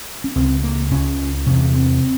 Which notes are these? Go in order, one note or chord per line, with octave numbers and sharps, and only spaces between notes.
C#4
C#2 C#3 C4
A#3
C#2 C#3 C#4
E2 C3 C#4
C4